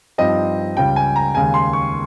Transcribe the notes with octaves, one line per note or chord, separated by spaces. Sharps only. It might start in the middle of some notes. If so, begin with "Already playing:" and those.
G2 F3 C4 D#4 D#5
C#2 C#3 G3 C#4 G5
G#5
A#5
D#2 C#3 G#3 G#5
C6
C#6